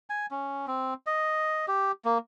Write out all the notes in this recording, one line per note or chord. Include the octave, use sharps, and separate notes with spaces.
G#5
C#4
C4
D#5
G4
A#3